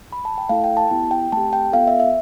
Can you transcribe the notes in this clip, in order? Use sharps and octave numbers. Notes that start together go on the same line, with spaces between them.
B5
A5
G5
A3 E4 A4 F5
G5
A5
B3 E4 G4
G5
A3 C4 G4 A5
G5
B3 F4 A4 F5
E5
E5